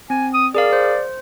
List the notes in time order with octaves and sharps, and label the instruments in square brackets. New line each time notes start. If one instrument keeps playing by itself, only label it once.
[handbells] C4 [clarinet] G#5
[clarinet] D#6
[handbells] G#4 A#4 F5 [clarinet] D5
[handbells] C5